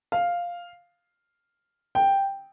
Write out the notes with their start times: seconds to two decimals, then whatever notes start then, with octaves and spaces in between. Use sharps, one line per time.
0.12 F5
1.95 G5